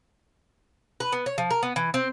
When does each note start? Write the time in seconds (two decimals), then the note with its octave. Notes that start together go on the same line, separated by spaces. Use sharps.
1.00 B4
1.12 B3
1.26 C#5
1.38 F3
1.51 A#4
1.63 B3
1.76 E3
1.94 C4